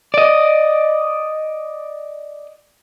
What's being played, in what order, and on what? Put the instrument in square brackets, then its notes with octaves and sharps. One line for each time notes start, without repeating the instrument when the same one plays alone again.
[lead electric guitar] D5 D#5